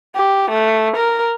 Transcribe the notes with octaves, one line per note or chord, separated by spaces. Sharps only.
G4
A3
A#4